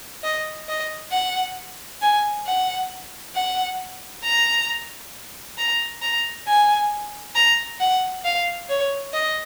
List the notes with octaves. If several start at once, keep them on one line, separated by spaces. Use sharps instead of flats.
D#5
D#5
F#5
G#5
F#5
F#5
A#5
A#5
A#5
G#5
A#5
F#5
F5
C#5
D#5